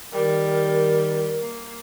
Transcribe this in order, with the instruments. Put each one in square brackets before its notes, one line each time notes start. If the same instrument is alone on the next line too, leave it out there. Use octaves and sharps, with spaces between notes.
[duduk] D#3 [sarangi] G3 [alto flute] A#4
[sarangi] A#3